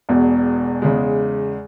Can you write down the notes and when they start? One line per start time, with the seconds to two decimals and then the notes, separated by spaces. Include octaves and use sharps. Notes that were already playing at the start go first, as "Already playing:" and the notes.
0.09 E1 E2 B2
0.82 E2 C#3 G#3